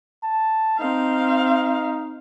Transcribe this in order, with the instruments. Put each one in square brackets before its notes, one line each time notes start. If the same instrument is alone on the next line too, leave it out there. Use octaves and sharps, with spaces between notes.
[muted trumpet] A5
[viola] C4 F5 [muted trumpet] D#4